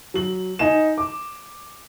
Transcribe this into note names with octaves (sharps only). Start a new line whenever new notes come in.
F#3 F#7
D#4 G#5 E7
D6